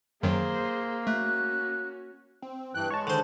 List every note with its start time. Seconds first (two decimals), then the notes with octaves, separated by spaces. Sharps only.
0.23 F#2 D#3 F#3 A#3 G#4 C5
1.07 A3 C#4 F#4 F#6
2.42 C4
2.75 G2 E3 G5 F#6
2.90 G#3 C#5 A5 C#6
3.07 D3 D#3 C5